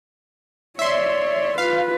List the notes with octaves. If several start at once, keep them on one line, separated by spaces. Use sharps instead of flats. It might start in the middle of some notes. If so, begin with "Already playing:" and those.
C#5 D5 E5 C6
F4 B4 F5